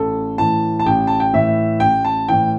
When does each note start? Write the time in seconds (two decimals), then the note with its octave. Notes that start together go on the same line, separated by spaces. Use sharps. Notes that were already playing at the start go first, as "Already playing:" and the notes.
Already playing: A1 A4
0.38 A2 E3 A5
0.80 A5
0.86 A1 G5
1.07 A5
1.20 G5
1.33 A2 E3 E5
1.80 A1 G5
2.05 A5
2.28 A2 E3 G5